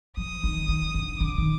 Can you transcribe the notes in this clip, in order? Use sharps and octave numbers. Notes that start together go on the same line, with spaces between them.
F3 D#6
D#3
D#3
D3
D3 D6
D#3